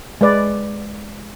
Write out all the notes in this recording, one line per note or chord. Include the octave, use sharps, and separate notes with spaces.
G#3 B4 D5